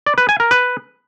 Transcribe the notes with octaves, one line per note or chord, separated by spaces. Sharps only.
D5
B4
G#5
A#4
B4